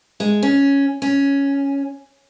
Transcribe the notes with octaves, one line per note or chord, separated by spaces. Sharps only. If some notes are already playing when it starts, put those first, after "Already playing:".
G#3
C#4
C#4